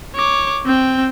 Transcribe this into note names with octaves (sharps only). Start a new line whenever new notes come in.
C#5 D6
C4 G5